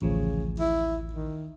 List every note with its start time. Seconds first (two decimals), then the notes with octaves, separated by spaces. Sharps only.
0.02 A1 D2 C#3 F3
0.60 E4
1.13 D#3